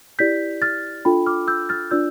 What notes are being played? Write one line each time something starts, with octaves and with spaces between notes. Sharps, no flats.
E4 G4 D5 G6 B6
F6 A6
D4 F4 A4 G5 B5
D6 F6
E6 G6
F6 A6
D4 F4 B4 D5 E6 G6